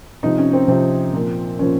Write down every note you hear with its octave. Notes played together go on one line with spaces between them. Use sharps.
C3 F3 D#4
C#4
C4
C3 F3 C4
A#2 F3
A#2 F3 C#4